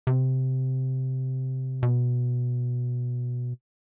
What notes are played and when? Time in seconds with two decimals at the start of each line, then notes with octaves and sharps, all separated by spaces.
0.07 C3
1.83 B2